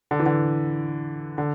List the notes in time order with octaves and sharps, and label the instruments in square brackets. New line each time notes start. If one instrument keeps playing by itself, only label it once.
[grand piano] D3
E3
D3
D3